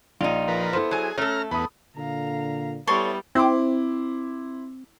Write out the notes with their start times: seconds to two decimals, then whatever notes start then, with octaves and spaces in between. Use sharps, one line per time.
0.21 A#1 D#4 F4
0.48 F3 A#4 B4
0.73 B3 E4 A4 C5
0.91 F#3 G#4 G#5
1.18 A3 C#4 A4 A#5 F6
1.51 E2 B3 B5 D#6
1.97 A#2 D3 F5 A#5
2.87 G3 B3 E4 A4 C#5 C6
3.35 C4 E4 C6 D6